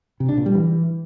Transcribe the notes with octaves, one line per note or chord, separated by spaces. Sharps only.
C3
D4
A#2
G3
E3